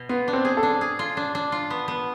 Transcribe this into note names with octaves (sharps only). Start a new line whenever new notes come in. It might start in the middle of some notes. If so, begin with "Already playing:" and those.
Already playing: B2
B3 F4
D4
C4
G#4
A4
D4
G#4
F4
D4
D4
F4
B3
B3